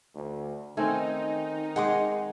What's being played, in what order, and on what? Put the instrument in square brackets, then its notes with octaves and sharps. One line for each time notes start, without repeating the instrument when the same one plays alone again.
[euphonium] D2
[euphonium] D#3 [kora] A3 C4 C#4 [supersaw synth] D#4 [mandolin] G#5
[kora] G#3 G#4 [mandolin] F#5 C6 D6